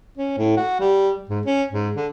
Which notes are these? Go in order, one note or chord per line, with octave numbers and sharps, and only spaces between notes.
C#4
A2
F#4
G3
G#2
C#4
G#2
D3